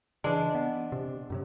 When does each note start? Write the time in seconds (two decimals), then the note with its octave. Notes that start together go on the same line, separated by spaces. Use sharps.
0.24 C#3 E3 G#3 D4
0.55 B3
0.92 C3
1.30 F#2 C3 F#3